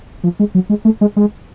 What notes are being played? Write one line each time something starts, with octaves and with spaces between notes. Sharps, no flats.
F3
G#3
F#3
G#3
A3
G#3
G#3